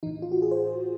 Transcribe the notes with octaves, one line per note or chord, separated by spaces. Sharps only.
A2 E3 D#4
F4
F#4
G#4
C5